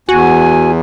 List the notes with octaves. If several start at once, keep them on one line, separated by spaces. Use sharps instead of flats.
E2 F#4 G#5